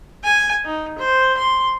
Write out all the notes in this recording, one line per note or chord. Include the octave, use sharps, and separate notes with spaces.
G#5
D#4
C5
C6